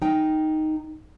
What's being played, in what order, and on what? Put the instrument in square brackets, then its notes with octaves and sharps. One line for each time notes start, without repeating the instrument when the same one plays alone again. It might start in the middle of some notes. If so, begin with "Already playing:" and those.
[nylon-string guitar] D#4 G5